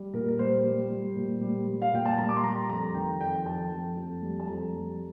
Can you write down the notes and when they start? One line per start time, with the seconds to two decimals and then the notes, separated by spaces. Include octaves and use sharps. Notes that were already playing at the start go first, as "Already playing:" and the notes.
Already playing: G3
0.13 A#2 A#4
0.28 A#4
0.39 G3 C5
0.64 G3
0.90 G3
1.16 A#2
1.41 G3
1.67 G3
1.82 F5
1.93 A#2 G5
2.05 A5
2.17 G3 A#5
2.29 D6
2.36 C6
2.43 G3 A#5
2.69 F2 A#5
2.94 D#3 G5
3.20 F2 G5
3.36 G5
3.45 F2 A5
3.71 F2
3.96 F2
4.22 G3
4.40 A5
4.47 F2 A#5
4.73 G3